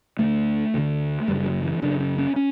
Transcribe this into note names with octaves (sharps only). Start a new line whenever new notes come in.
D2 D3 A3
D2 D3
F#1 F#2 C#3 G3
F#3
E3
F#1 F#2 C#3 D4
C#4
C#4
C#4